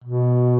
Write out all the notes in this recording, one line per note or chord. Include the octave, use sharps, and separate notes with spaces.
B2